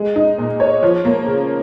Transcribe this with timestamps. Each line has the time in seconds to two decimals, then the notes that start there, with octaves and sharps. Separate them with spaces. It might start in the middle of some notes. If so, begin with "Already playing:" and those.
Already playing: G#3
0.16 D#4
0.38 A#2
0.60 C#5
0.83 F3
1.05 A#3
1.26 C#3